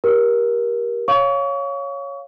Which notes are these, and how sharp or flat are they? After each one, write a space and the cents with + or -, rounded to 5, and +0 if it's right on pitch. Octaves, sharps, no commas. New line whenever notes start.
G4 +0 A#4 +20
C#5 +0 F5 +0 C#6 +35